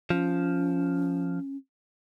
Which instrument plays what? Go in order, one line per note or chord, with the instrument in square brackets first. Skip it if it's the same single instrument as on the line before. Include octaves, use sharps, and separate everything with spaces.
[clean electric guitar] F3 [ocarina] C#4